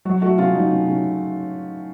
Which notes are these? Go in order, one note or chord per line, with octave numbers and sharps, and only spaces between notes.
F#3 F#4
A3 F#4
C#3 F4
F#3 D#4
C#3
C#3